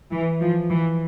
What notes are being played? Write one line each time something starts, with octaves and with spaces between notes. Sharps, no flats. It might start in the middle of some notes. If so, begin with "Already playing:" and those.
E3
F3
E3